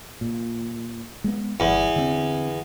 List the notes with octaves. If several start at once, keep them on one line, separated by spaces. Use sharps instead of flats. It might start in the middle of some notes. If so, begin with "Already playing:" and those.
A#2
G#3 B3
G1 E2
D3 C4